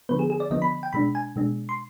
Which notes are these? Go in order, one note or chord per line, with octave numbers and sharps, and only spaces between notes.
D3 F3 B3 B4
G#4
G#4
D5
D3 F3 B3 D#5
B5
G5
B2 G#3 D4 B5
G#5
B2 G#3 D4
C6